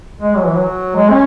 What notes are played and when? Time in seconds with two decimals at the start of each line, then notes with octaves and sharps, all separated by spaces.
0.21 G#3
0.36 F#3
0.46 E3
0.56 F#3
0.95 G#3
1.10 C#4